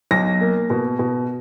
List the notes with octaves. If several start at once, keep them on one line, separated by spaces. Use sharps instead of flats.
B1 A#6
A#3
B2
B2